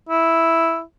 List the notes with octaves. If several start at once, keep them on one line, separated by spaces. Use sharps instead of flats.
E4